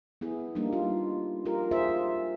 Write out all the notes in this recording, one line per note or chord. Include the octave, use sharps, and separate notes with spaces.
B3 E4 G#4
G3 A#3 D4 D#4
F4
F4 G4 A#4
F4 G#4 C5 E5